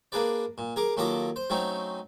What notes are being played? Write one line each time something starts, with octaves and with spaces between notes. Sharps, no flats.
A#3 D4 G#4 B4 D5
A#2
G#4 A#4 D6
D#2 F#3 F4 A4 D#5 D6
C5
F#3 A3 C4 C#4 D#4